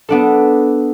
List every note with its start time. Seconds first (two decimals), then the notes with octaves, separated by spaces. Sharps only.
0.09 B3 D4 A4